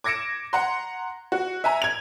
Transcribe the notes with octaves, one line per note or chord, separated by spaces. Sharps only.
D6 G#6 A#6 C#7 D7 E7
F#5 A#5 C6
F#4
E5 G#5 A#5
G#6 F7